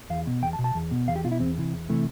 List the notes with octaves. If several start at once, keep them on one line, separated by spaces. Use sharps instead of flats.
E2 F5
B2
E2 G5
A5
B2
A5
E2
B2
E2 F5
G4
B2 F4
E4
E2 C4
C3 E3
E2
C3 E3 A3